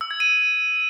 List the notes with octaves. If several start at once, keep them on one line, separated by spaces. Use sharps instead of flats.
E6
G#6
D#7